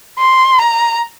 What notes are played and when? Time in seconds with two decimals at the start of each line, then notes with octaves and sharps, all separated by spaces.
0.19 C6
0.59 A#5